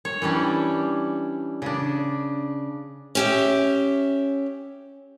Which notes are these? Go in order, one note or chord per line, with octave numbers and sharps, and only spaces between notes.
C#5
E3 G3 C#4 D4
C#3 D4
C#4 G4 E5